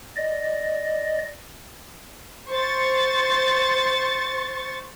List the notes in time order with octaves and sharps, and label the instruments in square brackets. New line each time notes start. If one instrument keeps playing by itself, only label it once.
[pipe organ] D5 D#5
[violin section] C5 C#6 A6